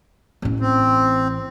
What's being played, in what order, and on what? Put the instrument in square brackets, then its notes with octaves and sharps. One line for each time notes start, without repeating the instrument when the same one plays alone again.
[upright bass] A1 C#4
[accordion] C4